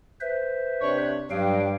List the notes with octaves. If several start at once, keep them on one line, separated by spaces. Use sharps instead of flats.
B4 C5 E5
C3 D4 C#5
G2 F#3 F5 G5